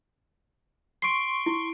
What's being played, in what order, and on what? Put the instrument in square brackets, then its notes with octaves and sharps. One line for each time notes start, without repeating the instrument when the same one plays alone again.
[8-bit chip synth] C6 C#6 [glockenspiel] C7 D7
[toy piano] E4